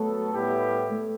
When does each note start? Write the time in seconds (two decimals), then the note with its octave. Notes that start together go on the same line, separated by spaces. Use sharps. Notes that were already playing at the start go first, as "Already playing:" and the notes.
Already playing: F#3 A3 B3 F#4 A4
0.32 A2 G3 B3 E4 G4
0.90 A3